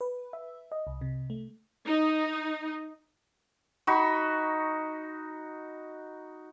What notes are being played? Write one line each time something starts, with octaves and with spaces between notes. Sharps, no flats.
B4
E5
D#5
C2
C3
A3
D#4
D#4 F#4 B5 C#6